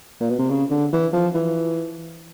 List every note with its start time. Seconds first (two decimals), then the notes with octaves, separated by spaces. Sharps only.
0.20 A#2
0.30 B2
0.39 C3
0.50 C#3
0.70 D3
0.93 E3
1.13 F3
1.35 E3